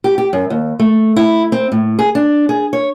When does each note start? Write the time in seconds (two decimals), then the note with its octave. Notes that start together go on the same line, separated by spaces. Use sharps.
0.04 G4
0.18 G4
0.33 F#2
0.50 D#2
0.79 A3
1.16 E4
1.52 C4
1.72 A2
1.99 G#4
2.15 D4
2.49 G#4
2.73 C#5